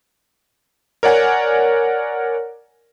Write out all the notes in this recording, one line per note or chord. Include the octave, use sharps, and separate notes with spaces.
A#4 C#5 D5 F#5 G#5